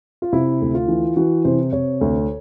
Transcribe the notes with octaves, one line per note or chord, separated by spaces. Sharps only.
F4
C3 E4
D2
F4
E3
E3 F#4
C3 C5
C3 C#5
D2